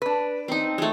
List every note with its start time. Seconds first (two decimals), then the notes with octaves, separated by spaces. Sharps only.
0.02 D4 B4
0.48 C4 D#4
0.78 G#3 A3